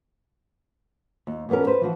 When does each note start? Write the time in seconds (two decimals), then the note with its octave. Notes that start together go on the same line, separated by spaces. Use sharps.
1.27 D#2
1.49 E2 A#3 B3 C#4 A#4
1.67 B4 C5
1.81 E3 F3 F#4